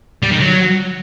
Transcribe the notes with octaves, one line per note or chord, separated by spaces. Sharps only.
G3
D#3
F#3